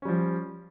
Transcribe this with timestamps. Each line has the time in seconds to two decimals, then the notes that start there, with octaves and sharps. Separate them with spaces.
0.02 C#4
0.05 G3
0.08 F3